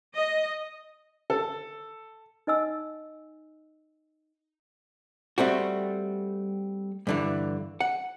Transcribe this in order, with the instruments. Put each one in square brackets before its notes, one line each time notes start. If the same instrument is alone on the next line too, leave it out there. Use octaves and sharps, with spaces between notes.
[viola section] D#5
[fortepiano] A4
[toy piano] D#4 D#5 G#5 E6
[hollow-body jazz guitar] G3 A3 C4 F#4
G2 D3 E3
F#5